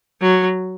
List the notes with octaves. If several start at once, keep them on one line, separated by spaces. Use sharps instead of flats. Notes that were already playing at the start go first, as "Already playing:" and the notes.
F#3